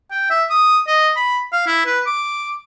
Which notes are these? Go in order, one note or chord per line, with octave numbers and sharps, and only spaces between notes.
G5
E5
D#6
D#5
B5
F5
E4
B4
D6